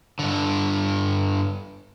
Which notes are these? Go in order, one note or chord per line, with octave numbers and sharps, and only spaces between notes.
G2 D3